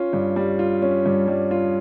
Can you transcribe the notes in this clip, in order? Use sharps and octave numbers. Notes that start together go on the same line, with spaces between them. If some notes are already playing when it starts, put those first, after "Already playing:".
Already playing: C#4 F4
G2
G3
F4
C#4
G2
G3
F4